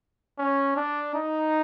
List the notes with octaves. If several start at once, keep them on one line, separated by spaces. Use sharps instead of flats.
C#4
D4
D#4